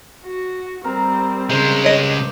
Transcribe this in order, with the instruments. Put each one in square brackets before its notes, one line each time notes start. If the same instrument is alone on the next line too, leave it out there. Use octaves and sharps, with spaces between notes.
[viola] F#4
[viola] G3 C4 [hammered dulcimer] A#4
[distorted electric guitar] C#3 G#3 [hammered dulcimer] C5
[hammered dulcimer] G2 D4 [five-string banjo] C#5 D#5